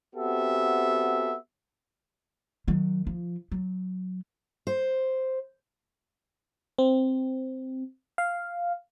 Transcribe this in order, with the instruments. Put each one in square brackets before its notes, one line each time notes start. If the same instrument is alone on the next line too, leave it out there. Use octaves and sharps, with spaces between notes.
[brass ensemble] B3 C4 F#4 G4 A4 E5
[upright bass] D#3 F#3
F3
F#3
[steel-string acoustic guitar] C5
[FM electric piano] C4
F5